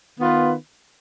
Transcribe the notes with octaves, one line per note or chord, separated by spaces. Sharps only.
D#3 B3 F4 B4